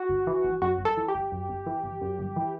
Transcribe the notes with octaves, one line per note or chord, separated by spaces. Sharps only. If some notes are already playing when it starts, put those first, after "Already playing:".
Already playing: F#4
G1
E3
G1
F#2 F#4
G1
A4
E3
G4
G1
F#2
G1
E3
G1
F#2
G1
E3